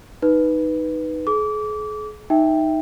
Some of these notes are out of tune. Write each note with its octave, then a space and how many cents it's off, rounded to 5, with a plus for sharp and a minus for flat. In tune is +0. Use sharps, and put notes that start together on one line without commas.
D#4 +0 B4 +0
G#4 +40 D6 -25
D#4 +0 E5 +0 G5 +0